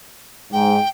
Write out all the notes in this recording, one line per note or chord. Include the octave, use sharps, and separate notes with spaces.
G#2 G5